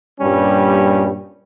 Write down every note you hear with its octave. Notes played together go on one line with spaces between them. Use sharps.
G2 A#2 G3 C#4